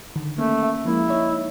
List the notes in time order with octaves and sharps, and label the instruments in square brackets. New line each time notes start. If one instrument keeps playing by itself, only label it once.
[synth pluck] D3 D#3
[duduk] A3 [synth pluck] A#3 C#4
[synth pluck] E5
[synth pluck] F3 G#3 A#3 [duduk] E4
[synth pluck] D#4 C#5 E5